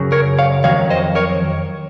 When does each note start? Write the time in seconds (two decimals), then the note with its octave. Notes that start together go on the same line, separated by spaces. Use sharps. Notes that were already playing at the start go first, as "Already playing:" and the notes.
Already playing: F#2 C#3 F#3
0.12 A#4 C#5
0.39 C#5 F5
0.64 F2 D#3 F#3 C#5 F5
0.90 C5 D#5
1.15 A#4 C#5